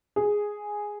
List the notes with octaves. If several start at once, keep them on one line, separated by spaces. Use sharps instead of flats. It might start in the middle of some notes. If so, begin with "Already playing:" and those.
G#4